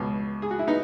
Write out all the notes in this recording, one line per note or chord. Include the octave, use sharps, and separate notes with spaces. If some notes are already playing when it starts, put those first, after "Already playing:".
Already playing: C#2 B2
G#4
F#4
E4
B3 D#4